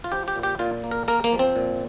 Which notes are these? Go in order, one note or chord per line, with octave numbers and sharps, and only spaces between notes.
F4
F3 G4
G4
A#2
G4
A#2 F4
A#3
A#4
A#3 A#4
A#3
F3
C4
A#2